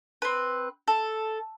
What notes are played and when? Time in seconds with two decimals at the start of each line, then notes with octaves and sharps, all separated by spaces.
0.22 C4 B4
0.88 A4